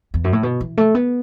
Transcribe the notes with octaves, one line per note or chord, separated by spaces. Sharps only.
E2
F#2
A2
B2
E3
A3
B3